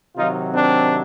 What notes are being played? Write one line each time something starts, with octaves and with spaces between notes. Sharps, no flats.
C3 D#3 F#3 D#4 F4
C4 D4